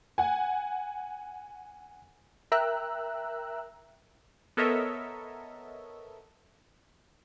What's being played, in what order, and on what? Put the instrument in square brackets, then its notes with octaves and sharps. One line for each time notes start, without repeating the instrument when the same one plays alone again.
[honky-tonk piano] F#5 G#5
[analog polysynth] A#4 E5 G5 A#5 E6 F#6
[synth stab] B3 A4 A#4 C#5 D#5 E5